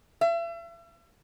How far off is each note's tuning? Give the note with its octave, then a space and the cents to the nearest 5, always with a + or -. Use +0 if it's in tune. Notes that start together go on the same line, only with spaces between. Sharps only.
E5 +40